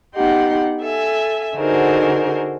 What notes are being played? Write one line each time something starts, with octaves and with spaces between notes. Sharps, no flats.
B3 D#4 G4 F#5 C6
A4 E5 G#5
D3 D#4 F#4 G#4 A#4 C5